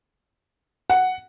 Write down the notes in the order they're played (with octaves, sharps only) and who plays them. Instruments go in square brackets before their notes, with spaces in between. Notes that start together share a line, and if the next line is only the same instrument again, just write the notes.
[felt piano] F#5